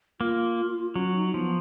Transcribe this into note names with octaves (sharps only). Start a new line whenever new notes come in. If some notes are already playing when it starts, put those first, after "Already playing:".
A#3 F4
F#3 C#4
D#4
F3 B3